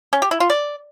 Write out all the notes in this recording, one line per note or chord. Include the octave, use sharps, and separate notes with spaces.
C#4
G4
E4
F4
D5